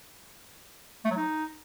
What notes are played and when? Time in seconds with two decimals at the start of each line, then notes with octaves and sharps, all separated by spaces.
1.05 A3
1.11 F#3
1.17 D#4